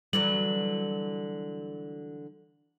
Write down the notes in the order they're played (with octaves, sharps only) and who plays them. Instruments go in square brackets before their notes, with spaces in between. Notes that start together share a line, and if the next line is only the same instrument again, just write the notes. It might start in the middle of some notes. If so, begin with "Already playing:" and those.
[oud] D3 E3 F#3 [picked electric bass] G3 [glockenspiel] F#7